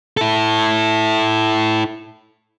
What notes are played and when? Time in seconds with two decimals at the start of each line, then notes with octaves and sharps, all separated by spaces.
0.17 E4 A4